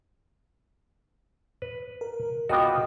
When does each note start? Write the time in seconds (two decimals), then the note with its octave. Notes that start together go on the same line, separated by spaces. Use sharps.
1.62 B4
2.01 A#4
2.49 B3 F4 F#4 D#5 G5 D6